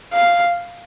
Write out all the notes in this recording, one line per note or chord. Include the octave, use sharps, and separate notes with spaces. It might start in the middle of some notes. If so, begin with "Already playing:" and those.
F5